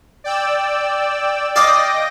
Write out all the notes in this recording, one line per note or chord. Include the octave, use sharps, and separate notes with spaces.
D5 G5 E6
D5 D#5 F5 G5 D#6 A#6